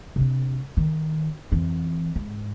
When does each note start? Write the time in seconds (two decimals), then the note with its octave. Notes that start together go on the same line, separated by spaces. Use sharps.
0.16 C3 D4
0.77 D#3
1.52 F2 E3
2.16 G#2